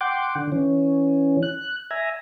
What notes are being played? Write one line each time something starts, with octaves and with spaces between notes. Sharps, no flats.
F#5 G5 C6 D6
D3
E3 C#4
F#6
E5 G#5 A#5